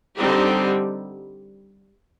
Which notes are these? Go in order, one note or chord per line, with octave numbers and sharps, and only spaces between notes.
D3 G3 C4 D#4 G4